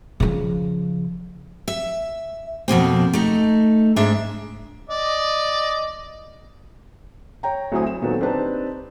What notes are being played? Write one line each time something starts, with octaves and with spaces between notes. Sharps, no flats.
C#3 F3
E5
F2 B2 A#3 C4
A3 D#4
G#2 G#3 D4 E5
D5 D#5
C#5 G5 A#5
D2 F#3 C4 E4 G#5 D#6
E7
A#2 D#3 F#3 B3 C4 A4
C4 D4 D#4 G4 B4 A5